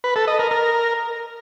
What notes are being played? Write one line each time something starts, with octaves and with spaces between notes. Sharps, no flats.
B4
A4
D#5
A#4
A#4